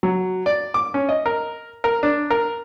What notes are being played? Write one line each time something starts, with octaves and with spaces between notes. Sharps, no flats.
F#3
D5
D6
C#4
D#5
A#4
A#4
D4
A#4